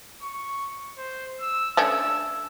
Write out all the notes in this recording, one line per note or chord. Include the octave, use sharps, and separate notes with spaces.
C#6
C5
E6
A3 C#4 D4 E6